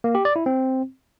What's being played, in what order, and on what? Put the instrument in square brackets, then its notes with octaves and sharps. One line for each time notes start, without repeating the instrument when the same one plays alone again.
[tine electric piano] A#3
G4
D5
E4
C4